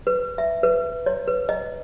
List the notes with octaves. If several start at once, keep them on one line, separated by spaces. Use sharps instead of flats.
B4
E5
B4
C#5
B4
D#5